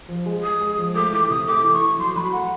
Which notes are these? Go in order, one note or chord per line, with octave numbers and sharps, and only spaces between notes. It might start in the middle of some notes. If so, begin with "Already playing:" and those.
F3
G#3
G#3 D#6
G#3
F3
A3 D6
E3 D6
C3 D#6
A3 D6
E3
C#6
E3
F#3 C6
F#3 B5
A3 F#5